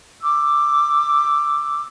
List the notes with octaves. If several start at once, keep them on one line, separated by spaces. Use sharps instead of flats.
D6 E6